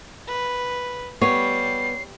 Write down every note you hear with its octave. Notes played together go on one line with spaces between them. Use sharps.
B4
G3 B3 C#5 C7